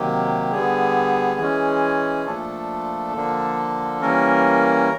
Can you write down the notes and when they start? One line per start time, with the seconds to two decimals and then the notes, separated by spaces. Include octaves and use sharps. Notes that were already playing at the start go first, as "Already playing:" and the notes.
Already playing: C3 D#3 F#3 A#3 G4
0.51 D3 G3 B3 G#4
1.39 E3 G#3 C#4
2.26 A#2 F3 A3 D4 A4
3.14 D3 F3 A#3 D4
4.01 E3 G3 A#3 C#4 A#4